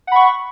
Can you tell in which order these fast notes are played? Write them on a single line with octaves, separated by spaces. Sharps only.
F#5 B5 C#6